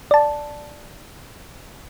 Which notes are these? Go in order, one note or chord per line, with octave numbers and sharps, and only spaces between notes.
D5 A5